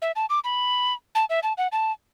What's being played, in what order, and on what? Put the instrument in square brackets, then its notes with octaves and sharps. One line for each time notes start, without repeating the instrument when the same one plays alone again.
[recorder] E5
A5
D6
B5
A5
E5
A5
F#5
A5